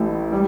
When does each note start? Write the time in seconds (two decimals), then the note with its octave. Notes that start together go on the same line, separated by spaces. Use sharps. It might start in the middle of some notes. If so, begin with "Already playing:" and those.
Already playing: A1 A2 A3 E4
0.32 G3